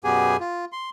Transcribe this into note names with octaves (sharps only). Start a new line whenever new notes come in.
F#2 B2 B3 G4 G#4 G#5
F4
C6